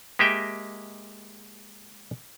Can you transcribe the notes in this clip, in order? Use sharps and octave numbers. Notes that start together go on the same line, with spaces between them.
G#3 A#3 G4 D#5 E5 G5